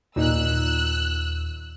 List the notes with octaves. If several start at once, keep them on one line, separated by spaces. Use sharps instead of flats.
D#2 A#2 D#4 E6 F#6